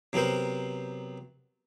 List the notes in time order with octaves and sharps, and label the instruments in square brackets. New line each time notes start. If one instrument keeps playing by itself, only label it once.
[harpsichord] C3 F#3 B3 A#4 C5